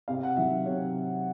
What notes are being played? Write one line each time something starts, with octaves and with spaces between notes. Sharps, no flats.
C3 F5
F#5
D#3 F#3 E5
C3 C#5